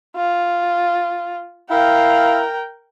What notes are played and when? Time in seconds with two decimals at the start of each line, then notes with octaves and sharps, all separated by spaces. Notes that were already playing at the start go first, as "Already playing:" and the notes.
0.16 F4
1.70 E4 A#4 F5 G5